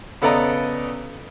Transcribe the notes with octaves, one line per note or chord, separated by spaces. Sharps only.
C#3 B3 A4 D5 D#5 A#5